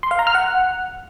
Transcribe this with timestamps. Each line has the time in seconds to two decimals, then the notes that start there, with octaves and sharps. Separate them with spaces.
0.03 C6
0.11 F5
0.19 A#5
0.27 F6
0.35 F#5